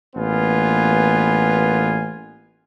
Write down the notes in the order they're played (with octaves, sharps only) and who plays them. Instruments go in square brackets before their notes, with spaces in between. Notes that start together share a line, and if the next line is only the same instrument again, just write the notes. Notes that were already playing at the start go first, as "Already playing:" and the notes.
[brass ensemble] A1 A#3 B3 F4 G#5